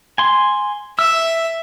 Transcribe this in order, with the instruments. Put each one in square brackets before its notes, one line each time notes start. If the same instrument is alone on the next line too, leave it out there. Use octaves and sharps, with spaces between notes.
[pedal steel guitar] G#5 C6
[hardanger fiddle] E5 [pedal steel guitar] E6